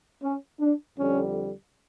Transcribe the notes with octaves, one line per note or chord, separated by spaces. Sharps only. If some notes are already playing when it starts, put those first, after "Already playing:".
C#4
D4
F2 D3 G3 C#4